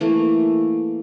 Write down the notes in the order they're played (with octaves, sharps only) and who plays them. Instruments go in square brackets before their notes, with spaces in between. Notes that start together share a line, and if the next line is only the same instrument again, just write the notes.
[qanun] E3 A3 A#3